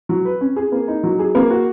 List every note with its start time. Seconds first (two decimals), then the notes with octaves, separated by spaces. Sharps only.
0.09 F#3
0.25 B4
0.41 C#4
0.56 G#4
0.72 A#3
0.88 D#4
1.03 F#3
1.19 G#4
1.35 A#3
1.50 F#4